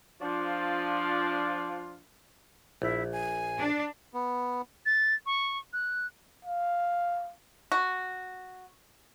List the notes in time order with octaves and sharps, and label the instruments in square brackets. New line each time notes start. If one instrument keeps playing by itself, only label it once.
[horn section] F3 D4 F4
[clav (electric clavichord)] A#1 [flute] E4
[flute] G#5
[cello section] D4
[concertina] B3
[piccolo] A6
C#6
F#6
[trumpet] F5
[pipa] F#4